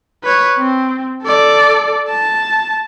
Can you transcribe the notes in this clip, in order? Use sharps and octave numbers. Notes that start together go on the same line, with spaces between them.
B4 C#5
C4
A4 D5
A5